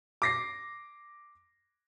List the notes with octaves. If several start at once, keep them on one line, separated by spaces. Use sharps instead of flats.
D6 A#6 C7